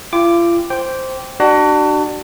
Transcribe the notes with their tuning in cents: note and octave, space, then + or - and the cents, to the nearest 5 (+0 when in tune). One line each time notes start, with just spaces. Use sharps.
F4 -40 G5 +0 D6 +5
C5 +0 G5 +0 D6 -20
D4 +30 F#4 +35